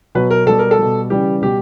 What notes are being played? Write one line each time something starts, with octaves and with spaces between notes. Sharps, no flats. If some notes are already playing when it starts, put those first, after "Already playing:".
B2 F#3 B4
A#4
B2 G3 A4
A#4
A4
B2 G3
C#3 E3 G3 G4
B2 G3 G4